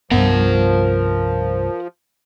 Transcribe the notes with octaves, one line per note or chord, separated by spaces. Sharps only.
C2 G2 F3 B3 A#4 F#5